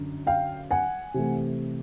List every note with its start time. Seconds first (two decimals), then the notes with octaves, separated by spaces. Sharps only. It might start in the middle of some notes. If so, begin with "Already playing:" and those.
Already playing: F#2 D3
0.27 F5 G5
0.71 F#5 G#5
1.14 C3 E3 A3